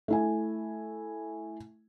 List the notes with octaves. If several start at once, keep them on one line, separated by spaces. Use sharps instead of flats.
A3 E4 G#5